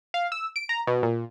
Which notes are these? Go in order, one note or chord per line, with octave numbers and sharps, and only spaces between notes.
F5
E6
D7
A#5
B2
A#2